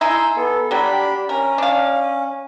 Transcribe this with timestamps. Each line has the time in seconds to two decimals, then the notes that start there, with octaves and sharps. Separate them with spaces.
0.01 D#4 E4 G#4 C6 E6 G6
0.36 B3 A4
0.71 F#3 G3 D4 G4 B5
1.29 C#4 A#4
1.58 D4 F5